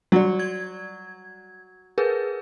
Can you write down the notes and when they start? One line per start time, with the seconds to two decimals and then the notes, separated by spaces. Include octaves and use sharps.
0.12 F#3 G3 D5
0.39 G#6
1.98 G#4 A#4 B4